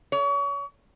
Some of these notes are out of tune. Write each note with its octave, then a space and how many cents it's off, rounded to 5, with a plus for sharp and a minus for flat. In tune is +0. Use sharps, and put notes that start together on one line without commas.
C#5 +35